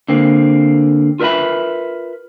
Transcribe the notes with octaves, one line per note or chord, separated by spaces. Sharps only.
D3 A#3 C4
F4 A#4 B4 D5 E5 B5